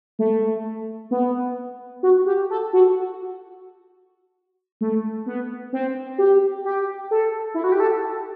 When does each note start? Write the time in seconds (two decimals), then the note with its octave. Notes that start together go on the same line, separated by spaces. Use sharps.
0.19 A3
1.11 B3
2.03 F#4
2.26 G4
2.50 A4
2.73 F#4
4.81 A3
5.26 B3
5.73 C4
6.18 G4
6.65 G4
7.11 A4
7.54 E4
7.64 F#4
7.72 G4
7.80 A4